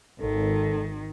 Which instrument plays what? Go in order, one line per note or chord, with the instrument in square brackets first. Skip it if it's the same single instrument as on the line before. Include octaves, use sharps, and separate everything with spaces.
[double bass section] G#1 [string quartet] D#3 [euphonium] A4